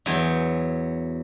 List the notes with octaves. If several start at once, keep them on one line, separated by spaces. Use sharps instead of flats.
E2 F#3 G5 G#5